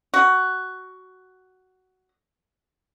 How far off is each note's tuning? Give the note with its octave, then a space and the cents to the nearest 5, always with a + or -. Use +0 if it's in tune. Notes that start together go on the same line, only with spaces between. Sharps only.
F#4 +10